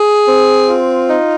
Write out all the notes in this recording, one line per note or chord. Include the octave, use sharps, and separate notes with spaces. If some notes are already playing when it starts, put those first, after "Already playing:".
Already playing: G#4
C4
F4
D#4